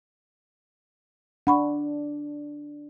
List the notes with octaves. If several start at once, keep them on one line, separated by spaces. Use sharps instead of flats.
D4 F#5 B5 C#6